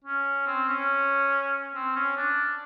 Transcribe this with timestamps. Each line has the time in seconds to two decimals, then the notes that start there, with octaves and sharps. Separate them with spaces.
0.04 C#4
0.47 C4
0.69 C#4
1.75 C4
1.96 C#4
2.17 D4